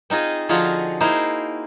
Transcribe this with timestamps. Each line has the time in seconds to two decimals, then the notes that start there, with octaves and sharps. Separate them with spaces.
0.10 C4 D#4 F4 G#4 D#5
0.49 D3 F3 D#4 F4 F#4 G#4
1.00 A#3 D#4 E4 G#4 A#4 C5